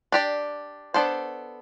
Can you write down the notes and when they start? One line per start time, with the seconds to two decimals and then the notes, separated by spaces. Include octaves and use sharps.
0.12 D4 G4 D5
0.94 B3 D4 A4 C5